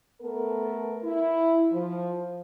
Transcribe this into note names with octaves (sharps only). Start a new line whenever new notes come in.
A3 B3 A4 A#4
E4
F3